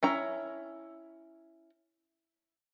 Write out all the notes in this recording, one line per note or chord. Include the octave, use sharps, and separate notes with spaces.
C#4 E4 A#5